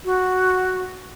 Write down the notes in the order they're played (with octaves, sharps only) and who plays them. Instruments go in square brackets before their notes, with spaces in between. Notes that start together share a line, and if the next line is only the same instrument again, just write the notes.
[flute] F#4